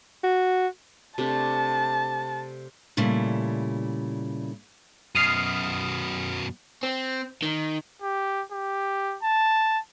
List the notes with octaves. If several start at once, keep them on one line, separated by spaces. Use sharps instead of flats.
F#4
C3 A3 D4 A5
A#2 C#3 G3 A3 E4
F#2 B2 D#6 F6 C7
C4
D#3
G4
G4
A5